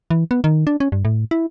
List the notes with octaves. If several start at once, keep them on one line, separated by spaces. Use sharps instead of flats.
E3
B3
D#3
D4
C#4
G2
A2
E4